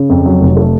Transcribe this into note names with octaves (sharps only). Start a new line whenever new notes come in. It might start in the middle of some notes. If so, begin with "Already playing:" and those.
Already playing: C#3
F2
F#3
F1
A3